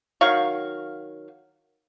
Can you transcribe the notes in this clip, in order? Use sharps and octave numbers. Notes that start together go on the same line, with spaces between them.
D#3 F#3 F5 C#6